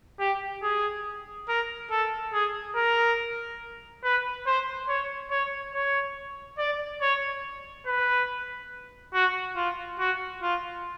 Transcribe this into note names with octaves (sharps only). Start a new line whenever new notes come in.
G4
G#4
A#4
A4
G#4
A#4
B4
C5
C#5
C#5
C#5
D5
C#5
B4
F#4
F4
F#4
F4